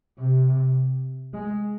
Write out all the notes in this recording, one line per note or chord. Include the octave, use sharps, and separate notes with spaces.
C3
G#3